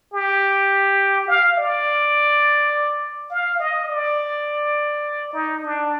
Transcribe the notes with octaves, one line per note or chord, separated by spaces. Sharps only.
G4
F5
D5
F5
D#5
D5
D#4
D4